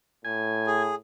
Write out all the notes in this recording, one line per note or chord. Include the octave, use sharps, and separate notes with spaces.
A2 G#5
G#4